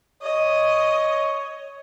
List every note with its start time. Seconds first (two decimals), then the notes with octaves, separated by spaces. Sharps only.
0.22 C#5 D#5